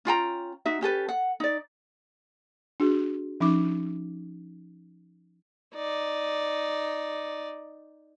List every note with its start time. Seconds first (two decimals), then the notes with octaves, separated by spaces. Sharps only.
0.05 C#4 F4 G5 A#5
0.65 D#4 F#4 E5
0.81 C#4 G4 A4 B4
1.09 F#5
1.40 D#4 D5
2.80 D4 F#4 G#4
3.40 F3 C#4 D#4 D6
5.75 D#4 D5